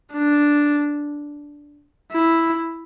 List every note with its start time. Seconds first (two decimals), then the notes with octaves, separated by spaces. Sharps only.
0.14 D4
2.12 E4